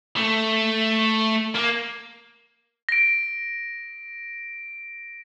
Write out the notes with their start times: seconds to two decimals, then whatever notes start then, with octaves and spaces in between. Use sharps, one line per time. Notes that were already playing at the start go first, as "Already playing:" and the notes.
0.16 A3
1.55 A#3
2.89 A#6 D7